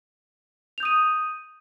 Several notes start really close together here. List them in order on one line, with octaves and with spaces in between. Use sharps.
F7 G6 D#6 D#7